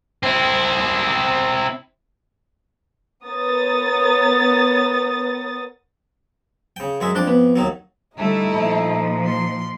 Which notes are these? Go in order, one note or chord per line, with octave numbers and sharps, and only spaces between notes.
C4 E4
B3 A#4 C#5 D#6 A6
C#3 G5
F#2 G#3 E5
F2 D4 C6 D6
B3
D#2 D#3 F#3
D3 G3 A3 D#4 E4 E5
A#2 F3
C6